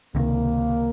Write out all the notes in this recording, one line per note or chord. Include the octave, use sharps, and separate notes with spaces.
C#2 C3 D#3 A#3